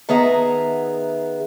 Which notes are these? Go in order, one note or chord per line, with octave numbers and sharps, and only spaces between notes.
D#3 B3 G#4 E5 F#5 A#5